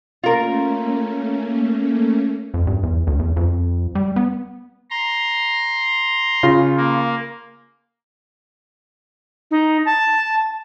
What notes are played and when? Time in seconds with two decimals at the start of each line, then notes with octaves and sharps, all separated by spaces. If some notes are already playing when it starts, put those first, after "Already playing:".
0.24 A3 A#3 C#4 F4 A#4
2.54 F2
2.67 G2
2.83 E2
3.07 D2
3.19 E2
3.37 F2
3.95 G3
4.16 B3
4.91 A#5 C6
6.43 C#3 F4
6.77 A#3
9.51 D#4
9.86 A5